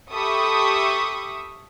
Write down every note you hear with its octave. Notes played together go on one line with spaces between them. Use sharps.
G4 A4 E5 B5 C#6 D#6